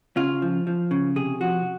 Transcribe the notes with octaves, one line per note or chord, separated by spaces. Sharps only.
C#3 F4
F3
F3
C#3
C3 G#4
F3 F#4